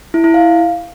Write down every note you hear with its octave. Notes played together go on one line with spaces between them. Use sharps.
E4
E4
F5